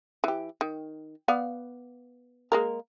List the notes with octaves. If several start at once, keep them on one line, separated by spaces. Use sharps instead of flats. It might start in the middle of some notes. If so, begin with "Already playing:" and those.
E3 G4
D#3
B3 D5 F5
G#3 A#3 A#4